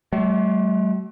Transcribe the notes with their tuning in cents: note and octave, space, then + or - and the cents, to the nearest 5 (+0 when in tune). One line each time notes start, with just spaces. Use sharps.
F#3 +40 A3 -40